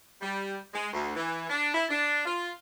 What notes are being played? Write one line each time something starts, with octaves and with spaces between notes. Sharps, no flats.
G3
G#3
D2
E3
D4
E4
D4
F4